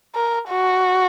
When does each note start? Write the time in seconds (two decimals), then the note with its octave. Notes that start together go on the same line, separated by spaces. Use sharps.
0.15 A#4
0.49 F#4